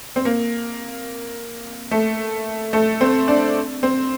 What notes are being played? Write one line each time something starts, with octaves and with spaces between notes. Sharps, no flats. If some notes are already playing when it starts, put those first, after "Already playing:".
C4
A#3
A3
A3
C4
D4
C4